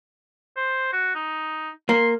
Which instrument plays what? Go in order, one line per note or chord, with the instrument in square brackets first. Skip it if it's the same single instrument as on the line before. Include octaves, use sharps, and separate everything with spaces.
[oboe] C5
F#4
D#4
[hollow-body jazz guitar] A#3 A#4 [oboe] C6